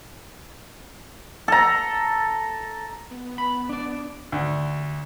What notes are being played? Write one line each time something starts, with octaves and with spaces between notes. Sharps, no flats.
A4 A#5
B3
B5
D4 D5
D2